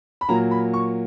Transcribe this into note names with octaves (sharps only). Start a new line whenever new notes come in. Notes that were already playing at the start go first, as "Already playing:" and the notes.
B5
A#2 F#3 A#3 A#5
B5
C#6